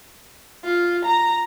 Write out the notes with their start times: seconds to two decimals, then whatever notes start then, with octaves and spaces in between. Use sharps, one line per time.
0.65 F4
1.05 A#5